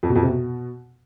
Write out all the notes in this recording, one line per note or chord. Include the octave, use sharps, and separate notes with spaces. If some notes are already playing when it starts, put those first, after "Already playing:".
F2
B2
F2
C3
B2